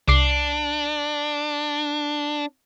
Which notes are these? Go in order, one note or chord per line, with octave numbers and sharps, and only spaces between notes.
C2 D4 D6 C7